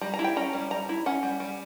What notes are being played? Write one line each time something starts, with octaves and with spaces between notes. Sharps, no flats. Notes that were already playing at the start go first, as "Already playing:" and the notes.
G3 A#5
A#5
E4
G5
C#4 A#5
G3
G3 A#5
E4
C#4 F#5
G3
G3